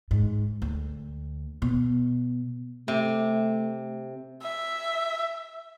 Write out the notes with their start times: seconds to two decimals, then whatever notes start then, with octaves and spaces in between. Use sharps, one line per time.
0.11 G#2
0.62 D2
1.62 B2
2.88 C3 A3
4.42 E5